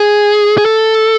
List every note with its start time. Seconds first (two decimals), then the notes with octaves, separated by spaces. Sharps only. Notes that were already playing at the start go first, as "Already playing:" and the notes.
Already playing: G#4
0.58 G#4
0.66 A4